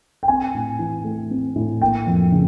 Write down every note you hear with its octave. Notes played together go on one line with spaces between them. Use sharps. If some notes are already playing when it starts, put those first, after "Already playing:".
G5
C4 G#5
A2
E3
A3
C4
A2
A#3 G5
F2
C#3